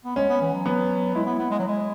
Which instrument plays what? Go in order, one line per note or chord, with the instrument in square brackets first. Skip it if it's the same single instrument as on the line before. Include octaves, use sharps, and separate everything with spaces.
[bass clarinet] B3
[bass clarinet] G#3 [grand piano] C#4
[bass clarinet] B3
E3
F#3
[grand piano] B3
[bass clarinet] G#3 [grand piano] E4
[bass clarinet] B3
B3
G#3
F#3
G#3